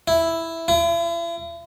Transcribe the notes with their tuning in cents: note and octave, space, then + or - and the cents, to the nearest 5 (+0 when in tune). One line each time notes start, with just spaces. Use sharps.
E4 +0
E4 +45